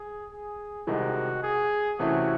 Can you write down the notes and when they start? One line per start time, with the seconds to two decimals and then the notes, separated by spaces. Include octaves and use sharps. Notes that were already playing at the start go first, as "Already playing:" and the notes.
Already playing: G#4
0.31 G#4
0.87 C2 C3 D#3 G#3 D#4 F#4
1.43 G#4
1.99 C3 E3 A3 C#4 E4 F#4